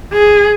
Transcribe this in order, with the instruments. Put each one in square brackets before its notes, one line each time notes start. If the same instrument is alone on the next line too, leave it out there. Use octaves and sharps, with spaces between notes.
[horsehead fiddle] G#4